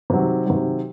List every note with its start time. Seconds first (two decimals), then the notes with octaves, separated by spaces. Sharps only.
0.10 C3 D#3 F#3
0.46 C3 D#3 F#3